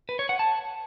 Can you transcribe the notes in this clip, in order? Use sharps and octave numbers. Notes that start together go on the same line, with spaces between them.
B4
C#5
F#5
A5